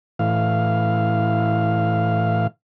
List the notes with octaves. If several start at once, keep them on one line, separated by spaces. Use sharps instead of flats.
A2 E3 F5